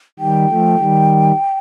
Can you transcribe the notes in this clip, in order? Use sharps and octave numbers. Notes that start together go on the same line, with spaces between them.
D#3 G3 G5
F3 A3
D#3 G3